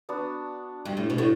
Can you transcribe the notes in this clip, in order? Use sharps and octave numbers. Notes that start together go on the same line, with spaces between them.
B3 D4 F#4
G2
A2
B2
A2